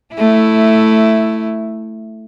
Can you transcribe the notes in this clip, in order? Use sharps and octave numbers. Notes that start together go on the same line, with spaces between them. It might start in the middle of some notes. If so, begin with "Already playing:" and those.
A3 E4